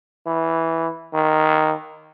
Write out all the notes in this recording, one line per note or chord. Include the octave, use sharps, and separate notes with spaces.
E3
D#3